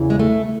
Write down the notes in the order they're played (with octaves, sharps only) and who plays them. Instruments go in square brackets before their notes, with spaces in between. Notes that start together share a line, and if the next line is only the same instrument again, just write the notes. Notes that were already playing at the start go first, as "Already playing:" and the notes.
Already playing: [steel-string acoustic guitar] E2 C#3 E3
G#3
A3